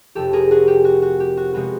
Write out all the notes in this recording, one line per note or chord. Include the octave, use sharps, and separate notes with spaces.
F1 F2 C3 G4 A4
G#4 A#4
F#4 G#4
G4
F#4
F#4
G4
F#4
C3 F3 G#3 B3 F#4